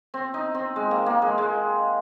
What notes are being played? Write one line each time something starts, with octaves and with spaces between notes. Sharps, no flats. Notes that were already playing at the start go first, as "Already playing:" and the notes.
C4
D#4
C4
G#3
A#3
A#3
G#3
G#3